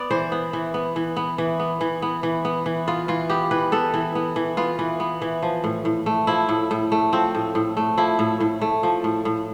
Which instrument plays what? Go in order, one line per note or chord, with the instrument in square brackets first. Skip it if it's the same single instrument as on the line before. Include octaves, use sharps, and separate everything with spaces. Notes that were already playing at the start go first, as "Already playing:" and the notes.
Already playing: [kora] B3 D5
E3 C5
B3
E3
B3
E3
B3
E3
B3
E3
B3
E3
B3
E3
B3 F4
E3 F4
B3 G4
E3 B4
B3 A4
E3
B3
E3
B3 F4
E3
B3
E3
F3
A2
A2
A3
F3 E4
A2
A2
A3
F3 C4
A2
A2
A3
F3 E4
A2
A2
A3
F3
A2
A2